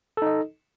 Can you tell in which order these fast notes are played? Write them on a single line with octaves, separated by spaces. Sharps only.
A4 D#4 D#5